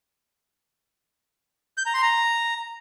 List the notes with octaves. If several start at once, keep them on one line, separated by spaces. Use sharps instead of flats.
G6
A#5
C6
A#5